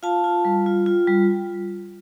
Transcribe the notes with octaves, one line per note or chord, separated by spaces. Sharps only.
F4 F5 A5
F4
G3
F4
F4
G3